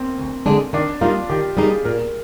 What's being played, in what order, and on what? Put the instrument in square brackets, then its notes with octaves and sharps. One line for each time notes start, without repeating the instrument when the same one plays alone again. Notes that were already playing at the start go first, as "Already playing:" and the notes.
Already playing: [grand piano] A#3 C4
[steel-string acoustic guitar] D2
D3 G#3 D4
[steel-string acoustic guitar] D#3 [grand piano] D4
[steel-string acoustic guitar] G3 A#3 D#4 [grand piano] F4
[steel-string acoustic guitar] D#3 [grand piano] G4
[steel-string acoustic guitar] G3 A#3 D#4 [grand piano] G#4
[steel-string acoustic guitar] A#2 [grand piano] A#4